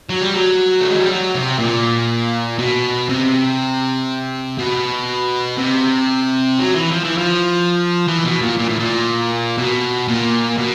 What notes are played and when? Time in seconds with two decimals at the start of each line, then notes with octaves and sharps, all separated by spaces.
0.09 F#3
0.21 G3
0.34 F#3
0.81 A3
0.90 G#3
1.00 G3
1.09 F#3
1.34 C3
1.59 A#2
2.58 B2
3.09 C3
4.58 B2
5.58 C3
6.58 F#3
6.75 E3
6.91 F3
7.04 E3
7.18 F3
8.08 E3
8.25 B2
8.42 A#2
8.58 A#2
8.69 A2
8.79 A#2
9.58 B2
10.08 A#2
10.58 B2